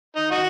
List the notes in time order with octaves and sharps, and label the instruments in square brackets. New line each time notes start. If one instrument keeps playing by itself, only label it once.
[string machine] D#3 [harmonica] D#4
[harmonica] D#4 F#4